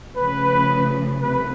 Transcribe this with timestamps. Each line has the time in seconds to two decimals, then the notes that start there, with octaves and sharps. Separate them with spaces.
0.15 C#3 F3 A3 B4
1.22 C2 C3 B4